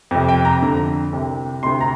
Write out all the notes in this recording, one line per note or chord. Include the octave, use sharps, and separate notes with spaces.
F2 C3
G5
A#5
F2 D3
C2 C3
D2 C3 C6
A#5